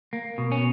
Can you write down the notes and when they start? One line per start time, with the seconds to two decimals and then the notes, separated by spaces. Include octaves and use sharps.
0.13 A#3
0.38 B2
0.52 C#4